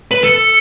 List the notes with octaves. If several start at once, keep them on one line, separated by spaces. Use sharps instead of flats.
B4
A4